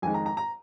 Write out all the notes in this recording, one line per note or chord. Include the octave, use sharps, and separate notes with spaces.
F2 D#3 G#3 G#5
A#5
A#5
A#5